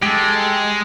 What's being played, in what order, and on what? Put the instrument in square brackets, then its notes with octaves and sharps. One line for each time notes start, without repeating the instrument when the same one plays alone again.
[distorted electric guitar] G#3 [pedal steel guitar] G4 A4